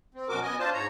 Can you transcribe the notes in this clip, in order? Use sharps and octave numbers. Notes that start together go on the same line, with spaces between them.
C4
F#2 B2 F#4 A#4 D6
B3 D#5 G#5
D4 F4 C5 A5
G#2 C#5 A#5